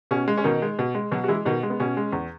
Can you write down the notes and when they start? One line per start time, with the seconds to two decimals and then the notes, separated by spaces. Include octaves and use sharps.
0.11 B2 C#4
0.28 G#3
0.38 C#4
0.44 B2 D#3 D#4
0.62 G#3
0.79 B2
0.95 G#3
1.12 B2 F#3 F#4
1.24 F#4
1.28 E3 G#3 E4
1.45 B2 D#3 D#4
1.63 G#3
1.70 B3
1.80 B2 C#4
1.97 G#3
2.13 E2